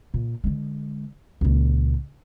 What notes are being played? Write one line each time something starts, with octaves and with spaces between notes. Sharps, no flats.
A#2
D3 G#3
C#2 A#2